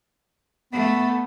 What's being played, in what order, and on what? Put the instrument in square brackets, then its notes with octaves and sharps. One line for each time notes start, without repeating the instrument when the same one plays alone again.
[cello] A3 [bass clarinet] B3